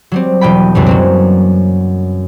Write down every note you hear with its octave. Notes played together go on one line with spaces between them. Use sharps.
F#3 G3 C4
E1 D#5 G5 B5
C#2 F#2 B2 G3
F#3 A#3 C4